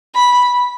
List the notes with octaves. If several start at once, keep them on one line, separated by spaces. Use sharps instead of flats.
B5